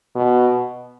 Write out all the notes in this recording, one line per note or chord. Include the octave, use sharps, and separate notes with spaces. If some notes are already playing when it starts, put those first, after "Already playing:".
B2